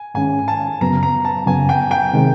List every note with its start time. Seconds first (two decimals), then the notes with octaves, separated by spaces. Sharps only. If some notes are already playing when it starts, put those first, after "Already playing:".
Already playing: G#5
0.14 G#2 D#3 G#3 C#4 G#5
0.48 A5
0.81 F#2 C#3 F#3 B3 A#5
1.03 A#5
1.25 A5
1.46 F#2 C#3 F#3 B3 G#5
1.69 G5
1.91 G5
2.13 C3 D#3 G#3